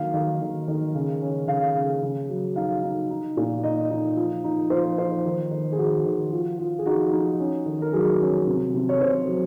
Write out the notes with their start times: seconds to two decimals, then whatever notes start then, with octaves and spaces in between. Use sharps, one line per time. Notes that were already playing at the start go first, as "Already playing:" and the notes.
Already playing: D#3 F#3 A#3 F5
0.14 D#3
0.42 D#3
0.68 D#3
0.95 C#3
1.22 C#4
1.48 C#3 F5
1.75 C#3
2.03 C#3
2.29 F#3
2.56 D#4 F5
2.83 D#4
3.10 D#4
3.37 A#2
3.63 D#4 D#5
3.91 D#4
4.17 F3
4.44 D#4
4.70 F3 C5
4.98 D#4 C5
5.25 D#3
5.51 D#3
5.72 G#4
5.78 D#3 F#4
6.05 D#3
6.32 F3
6.59 F3
6.79 G#4
6.86 D#4 F#4
7.12 D#4
7.39 C#4
7.66 D#3
7.82 A#4
7.93 F#3 G#4
8.20 C#4
8.47 C3
8.74 C3
8.89 C#5
9.01 C3 C5
9.27 F#3